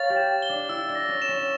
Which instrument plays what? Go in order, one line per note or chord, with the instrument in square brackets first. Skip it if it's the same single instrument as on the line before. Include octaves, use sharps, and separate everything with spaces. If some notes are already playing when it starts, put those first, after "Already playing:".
Already playing: [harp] A#4 C#5 F5 [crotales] A6
[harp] G4
[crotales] E7
G7
[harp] D4
[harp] E4 [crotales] E6
[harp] D4
[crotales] A#6
[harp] C#4
[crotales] E7
[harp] C#4